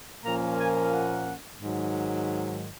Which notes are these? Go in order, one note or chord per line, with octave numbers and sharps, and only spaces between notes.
A#2 F3 A#3 C#4 A#5
G#5
F#5
G#2 D#3 F#3